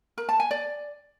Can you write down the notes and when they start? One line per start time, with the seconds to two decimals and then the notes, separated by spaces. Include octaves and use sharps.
0.18 A#4
0.29 A5
0.40 G#5
0.51 D5